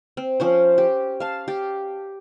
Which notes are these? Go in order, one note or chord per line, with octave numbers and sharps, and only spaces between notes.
C4
F3 C#4 C5
G4
F5 A5
G4